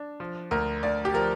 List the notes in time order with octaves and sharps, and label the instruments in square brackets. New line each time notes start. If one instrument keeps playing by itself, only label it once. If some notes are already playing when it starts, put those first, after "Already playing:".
Already playing: [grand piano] D4
F3
D2 A#4
D2 D5
G4
F3 A#4